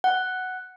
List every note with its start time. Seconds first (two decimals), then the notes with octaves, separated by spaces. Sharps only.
0.04 F#5